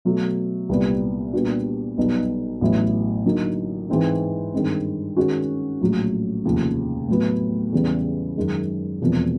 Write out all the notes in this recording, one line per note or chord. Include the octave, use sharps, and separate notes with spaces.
B2 F#3 A3
C2 A#2 G3 B3
A#2 G3 B3 D4 F#4
B1 B2 G3 B3 D#4
A1 A2 F#3 B3 E4
D3 F#3 A#3 D#4
G#2 E3 G#3 C4 D#4
G2 D#3 G#3 C4
D#3 G#3 C#4 F#4
A#1 A2 F#3
F1 D#2 C#3 F3
A2 F#3 B3
E2 C#3 E3 G3
F#2 D#3 G#3
E1 E2 C3 F3 A#3